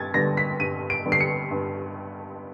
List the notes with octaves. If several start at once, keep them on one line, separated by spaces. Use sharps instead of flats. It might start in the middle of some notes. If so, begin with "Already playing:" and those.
Already playing: G2 G#6 A6
D3 G3 B3 A#6
B6
G2 D#7
D7
D3 G3 B3
C7
C#7
G2